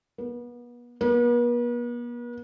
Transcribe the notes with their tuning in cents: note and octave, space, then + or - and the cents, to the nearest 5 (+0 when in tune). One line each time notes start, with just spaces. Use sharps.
B3 -35
B3 -45